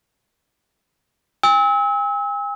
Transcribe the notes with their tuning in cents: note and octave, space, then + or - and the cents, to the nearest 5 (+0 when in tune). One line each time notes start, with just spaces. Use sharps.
G#5 -45 E6 -35